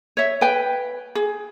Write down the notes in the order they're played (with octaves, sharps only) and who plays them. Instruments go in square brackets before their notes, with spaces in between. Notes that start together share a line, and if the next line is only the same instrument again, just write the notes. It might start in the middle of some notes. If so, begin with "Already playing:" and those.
[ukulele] C#5 E5
B4 G5
G#4